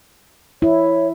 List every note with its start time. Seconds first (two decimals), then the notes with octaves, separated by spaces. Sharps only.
0.62 E4 C#5